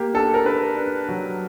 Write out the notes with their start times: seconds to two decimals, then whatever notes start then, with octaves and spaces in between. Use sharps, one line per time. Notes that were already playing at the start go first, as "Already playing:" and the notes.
Already playing: A#3 G4
0.14 D4 A4
0.34 A#4
0.45 D4 B4
0.76 D4
1.09 F#3